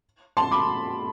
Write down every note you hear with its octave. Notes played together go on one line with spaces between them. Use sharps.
A5 C6
B5 D6